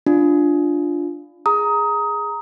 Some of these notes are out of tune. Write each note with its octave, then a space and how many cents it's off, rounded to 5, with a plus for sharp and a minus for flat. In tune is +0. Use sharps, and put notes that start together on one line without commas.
D4 +0 F4 +0
G#4 +0 A#5 +0 D#6 +20